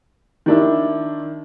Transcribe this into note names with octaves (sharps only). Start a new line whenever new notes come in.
D#3 D4 E4